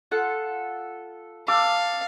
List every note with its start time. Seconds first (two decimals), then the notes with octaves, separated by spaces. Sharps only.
0.11 F4 A4 F#5
1.48 A4 F5 D6